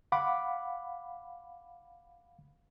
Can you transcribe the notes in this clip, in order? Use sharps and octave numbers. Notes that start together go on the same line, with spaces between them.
F5 F#5 B5 D6